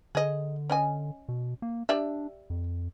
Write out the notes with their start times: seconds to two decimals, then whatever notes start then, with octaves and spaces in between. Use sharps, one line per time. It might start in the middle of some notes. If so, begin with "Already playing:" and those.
0.15 D3 G#4 D#5
0.70 C#4 D#5 G#5
1.29 B2
1.62 A#3
1.89 D4 G4 D5 E5
2.50 F2